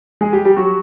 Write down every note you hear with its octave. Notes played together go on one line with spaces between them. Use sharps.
G#3 G#4
G3 G4
G3 G4
F#3 F#4